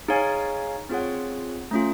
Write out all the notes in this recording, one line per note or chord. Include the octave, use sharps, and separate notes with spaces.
D#4 G#4 C#5 F5 G#5
C4 F4 G#4 C#5 F#5
A3 C#4 F4